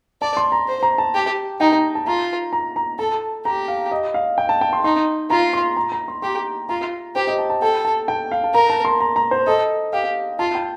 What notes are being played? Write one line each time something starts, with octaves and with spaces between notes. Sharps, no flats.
D5 A5
C6
A#5
C5
A#5
A5
G4
D#4 G5
A#5
A5
F4 A#5
A#5
A#5
A4 A5
G4 A#5
F5
D#5
F5
G5
A5
G5
C6
D#4 C6
F4 A#5
C6
A#5
A#5
C6
G4 C6
F4 A#5
G4 C5
D#5
A5
A5
A4 G5
A5
G5
F5
A5
A#4 A#5
A5
C6
A#5
A#5
C5
A4 D#5
G4 F5
F4 A5
G5